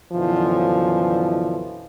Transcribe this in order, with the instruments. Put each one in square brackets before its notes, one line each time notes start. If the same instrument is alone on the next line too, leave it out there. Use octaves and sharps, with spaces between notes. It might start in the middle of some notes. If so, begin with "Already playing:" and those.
[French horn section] F#2 B2 D3 E3 F3